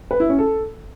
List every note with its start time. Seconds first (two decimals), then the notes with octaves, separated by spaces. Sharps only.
0.11 B4
0.20 E4
0.29 C#4
0.38 A4